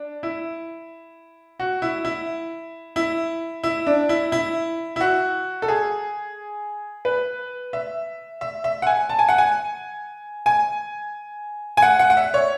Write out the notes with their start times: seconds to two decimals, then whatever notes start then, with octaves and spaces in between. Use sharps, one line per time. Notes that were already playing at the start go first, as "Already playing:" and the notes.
Already playing: D4
0.23 E4
1.60 F#4
1.82 E4
2.05 E4
2.96 E4
3.63 E4
3.87 D4
4.09 E4
4.32 E4
4.96 E4
5.00 F#4
5.62 A4
5.68 G#4
7.05 B4
7.73 E5
8.41 E5
8.64 E5
8.82 F#5
8.87 G#5
9.09 A5
9.19 G#5
9.29 F#5
9.38 G#5
10.46 G#5
11.77 G#5
11.82 F#5
11.99 F#5
12.10 F#5
12.17 E5
12.34 C#5